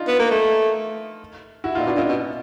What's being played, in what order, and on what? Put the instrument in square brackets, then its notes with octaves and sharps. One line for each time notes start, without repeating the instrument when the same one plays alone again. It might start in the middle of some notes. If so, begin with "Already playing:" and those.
Already playing: [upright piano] D4 D#4 F4
[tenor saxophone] B3
A#3
A3
[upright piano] E4 F#4
D#4 F4
[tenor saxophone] A#2
[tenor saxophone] B2 [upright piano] D4 E4
[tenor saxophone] A#2 [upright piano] C#4 D#4
[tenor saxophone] B2